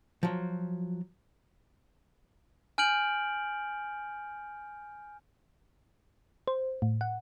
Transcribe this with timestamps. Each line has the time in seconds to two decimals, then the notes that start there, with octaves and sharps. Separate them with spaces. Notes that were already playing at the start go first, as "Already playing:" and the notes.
0.23 F3 F#3
2.78 G#5 F6 G6 D7 F#7
6.48 C5
6.82 A2
7.01 F#5